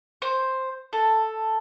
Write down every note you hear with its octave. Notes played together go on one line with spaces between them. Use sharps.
C5
A4